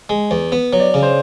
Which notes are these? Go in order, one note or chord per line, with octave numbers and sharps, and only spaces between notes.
G#3
E2
B3
F#3
D5
C#3
C5